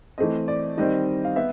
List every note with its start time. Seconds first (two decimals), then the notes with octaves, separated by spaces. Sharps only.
0.18 E3 A3 C4 D#5
0.48 D5
0.78 D#3 G3 C4 D#5
1.25 F5
1.36 B3 E5